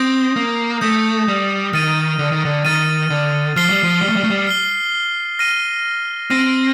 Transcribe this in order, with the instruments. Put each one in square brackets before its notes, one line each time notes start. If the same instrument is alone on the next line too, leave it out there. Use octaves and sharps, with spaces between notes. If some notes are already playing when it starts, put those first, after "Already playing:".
Already playing: [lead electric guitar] C4 [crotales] D#6 G6 A#6
[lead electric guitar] A#3
[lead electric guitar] A3 [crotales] D#6 G6 A#6
[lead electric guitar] G3
[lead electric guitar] D#3 [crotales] F6 A6 D#7
[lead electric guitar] D3
D#3
D3
[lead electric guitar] D#3 [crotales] F6 A6 D#7
[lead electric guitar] D3
[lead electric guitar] F3 [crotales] F6 C7 G7
[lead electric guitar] G3
F3
G3
A3
G3
A3
G3
[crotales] F6 C7 G7
F6 A#6 D#7
[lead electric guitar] C4 [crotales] F6 A#6 D#7